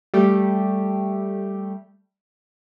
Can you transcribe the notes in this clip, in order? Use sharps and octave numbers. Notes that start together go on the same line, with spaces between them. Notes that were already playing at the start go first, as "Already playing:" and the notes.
G3 A3 G4